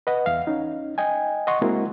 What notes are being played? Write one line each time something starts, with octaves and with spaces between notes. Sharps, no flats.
B4 D#5 F#5
E2 E5 F5
C#4 D#4
D#5 G5 G#5
D#5 F#5 C6 C#6
G#3 A#3 C4 E4 F#4 A#4